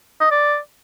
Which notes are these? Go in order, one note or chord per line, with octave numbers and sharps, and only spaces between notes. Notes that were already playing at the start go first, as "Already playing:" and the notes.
D#5
D5